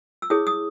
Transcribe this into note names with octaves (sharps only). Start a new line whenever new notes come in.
E6
E4 G#4 C#5 D#6
D#6